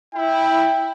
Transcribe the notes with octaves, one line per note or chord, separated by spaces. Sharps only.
E4 G5